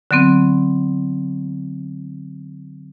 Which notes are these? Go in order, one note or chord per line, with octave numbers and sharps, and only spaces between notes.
D3 F#3 B3 C4